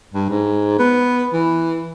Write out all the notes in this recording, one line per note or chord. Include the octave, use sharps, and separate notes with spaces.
G2
G#2
B3
E3